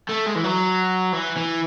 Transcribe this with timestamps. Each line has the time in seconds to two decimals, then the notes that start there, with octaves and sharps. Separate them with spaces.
0.09 A3
0.27 G#3
0.36 E3
0.44 F#3
1.13 E3
1.37 E3